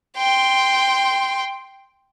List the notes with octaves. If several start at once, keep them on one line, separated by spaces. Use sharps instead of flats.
G5 C6